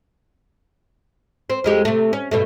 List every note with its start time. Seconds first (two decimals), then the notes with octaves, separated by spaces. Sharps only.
1.50 C4
1.64 F2 G#3 G4
1.85 C3 A3
2.13 C#4
2.31 G2 B2 A3